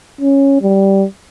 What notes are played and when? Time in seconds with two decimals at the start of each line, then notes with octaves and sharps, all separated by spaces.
0.21 C#4
0.62 G3